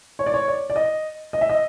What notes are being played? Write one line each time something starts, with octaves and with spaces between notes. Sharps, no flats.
C#5
D5
C#5
D5
D5
D#5
D#5
E5
D#5